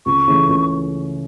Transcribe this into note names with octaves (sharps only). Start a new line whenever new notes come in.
C#2 C#6
C#3 E3 A3 C#4
C#2